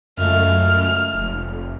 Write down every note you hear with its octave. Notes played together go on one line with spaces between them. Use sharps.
C#2 F#2 A3 F6
F1